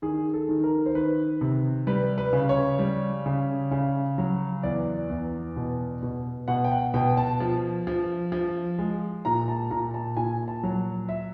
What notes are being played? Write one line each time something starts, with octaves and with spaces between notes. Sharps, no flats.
D#3 G#4
A4
D#3
A#4
C5
D#3 B4
C3
G3 B4
B4
C#3
C#5
G3
C#3
C#3
F#3
E2 D5
E2
B2
B2
B2 F#5
G5
F#5
B2 G5
A5
F3
F3
F3
G#3
A#2 A#5
A5
A#2 A#5
A5
A#2 G#5
A5
F#3
E5